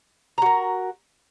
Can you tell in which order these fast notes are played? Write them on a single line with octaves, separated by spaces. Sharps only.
A#5 F#4 A#4